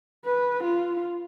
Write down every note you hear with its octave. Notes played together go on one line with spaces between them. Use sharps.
B4
F4